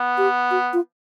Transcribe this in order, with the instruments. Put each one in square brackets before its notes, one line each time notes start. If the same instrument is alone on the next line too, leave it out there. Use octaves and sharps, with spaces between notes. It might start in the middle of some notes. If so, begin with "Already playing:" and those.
Already playing: [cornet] B3
[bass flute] G4
F#4
F4